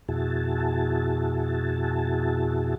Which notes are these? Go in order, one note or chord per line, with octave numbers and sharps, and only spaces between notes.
F2 B2 E4 F#4 G#4 A5